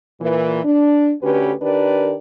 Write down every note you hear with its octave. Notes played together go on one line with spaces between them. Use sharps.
A#2 E3
D4
D2 D3 C#4 G4 B4
D#3 D4 G4 A#4 B4 D5